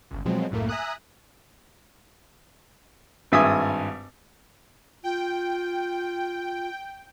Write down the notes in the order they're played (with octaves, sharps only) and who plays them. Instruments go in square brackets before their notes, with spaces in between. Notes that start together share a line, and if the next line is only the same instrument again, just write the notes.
[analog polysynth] G1 C#2
B2 F3 F#3 G#3 C4
C2 F#2 A2 A3 A#3
E5 G#5 A#5 D#6 F#6
[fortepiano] G#1 G2 E5 G#5 D#6
[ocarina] F4 [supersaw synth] G5